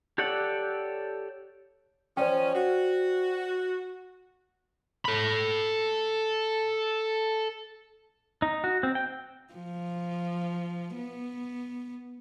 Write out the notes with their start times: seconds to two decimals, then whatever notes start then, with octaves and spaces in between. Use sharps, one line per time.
0.18 G4 A4 C#5 D5 F#5
2.17 F3 C#4 C5 D5 G5
2.55 F#4
5.05 A4 B5
8.42 D#4
8.64 F#4
8.83 C4
8.95 G5
9.54 F3
10.95 B3